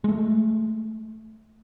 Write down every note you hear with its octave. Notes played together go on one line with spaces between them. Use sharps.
G#3 A3